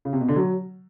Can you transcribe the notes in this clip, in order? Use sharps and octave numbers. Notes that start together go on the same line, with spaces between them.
C#3
C3
B2
D3
F#3